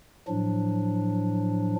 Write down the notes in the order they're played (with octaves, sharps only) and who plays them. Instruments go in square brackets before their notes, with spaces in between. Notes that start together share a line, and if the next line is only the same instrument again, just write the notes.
[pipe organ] A2 F3 F#3 D4